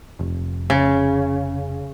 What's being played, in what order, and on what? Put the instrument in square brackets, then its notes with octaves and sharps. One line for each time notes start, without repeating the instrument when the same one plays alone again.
[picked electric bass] F1
[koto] C#3